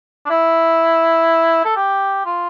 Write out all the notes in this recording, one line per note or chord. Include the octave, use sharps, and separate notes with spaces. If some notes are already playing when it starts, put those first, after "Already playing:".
D4
E4
A4
G4
F4